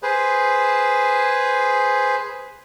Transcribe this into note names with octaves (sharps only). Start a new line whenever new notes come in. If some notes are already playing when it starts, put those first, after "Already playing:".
G#4 B4 C5